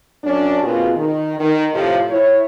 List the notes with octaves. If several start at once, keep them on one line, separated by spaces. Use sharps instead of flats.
F#2 F#3 C#4 D4
B2 A#3 C4 F4 F#4 G#4
D#3
D#3
A2 C3 F3
E4 C#5